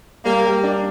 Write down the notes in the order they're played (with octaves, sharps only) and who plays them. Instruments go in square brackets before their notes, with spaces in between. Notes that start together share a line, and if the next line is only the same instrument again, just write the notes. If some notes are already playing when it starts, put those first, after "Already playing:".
[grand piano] G3 [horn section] A#3
[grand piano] G3
D4